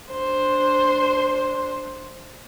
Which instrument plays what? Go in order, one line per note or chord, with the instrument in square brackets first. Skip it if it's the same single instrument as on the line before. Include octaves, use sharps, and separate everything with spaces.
[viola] D4 C5